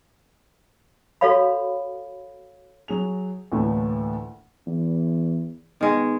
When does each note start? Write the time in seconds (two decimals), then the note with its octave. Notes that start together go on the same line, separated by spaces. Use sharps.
1.21 F#4 A4 C#5 F5 B5
2.88 F#3 G#4 F7
3.52 D2 A2 E3 A3 A#3
4.67 E2
5.81 D#3 G#3 B3